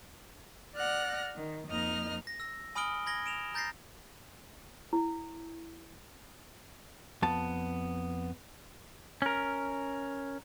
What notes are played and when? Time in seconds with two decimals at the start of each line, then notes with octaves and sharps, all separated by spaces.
0.76 D5 F#5 F6 F#6 A#6
1.36 D#3
1.68 F2 A#3 D#4 D#5 F6
2.27 A#6
2.40 E6 A#6
2.75 G#5 B5 D#6 F6 D7 G7
3.06 B5 G#6 A#6 G7
3.26 D7 E7 F7
3.54 A#5 G6 A6 A#6 C7
4.93 E4
7.22 F2 B3 A5
9.22 C#4 A#4